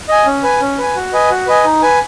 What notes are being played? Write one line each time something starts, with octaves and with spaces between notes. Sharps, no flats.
D#5 G#5
C#4
B4 G#5
C#4
B4 G#5
F#4
B4 D#5 G#5
F#4
B4 D#5 G#5
D#4
B4 G#5